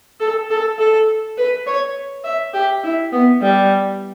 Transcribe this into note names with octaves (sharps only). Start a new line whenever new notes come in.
A4
A4
A4
B4
C#5
E5
G4
E4
B3
G3